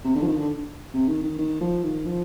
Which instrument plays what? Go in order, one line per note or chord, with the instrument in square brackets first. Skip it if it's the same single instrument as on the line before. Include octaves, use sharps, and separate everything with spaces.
[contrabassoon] C3
D3
F3
D#3
D3
C3
D#3
D#3
D#3
F3
D#3
F3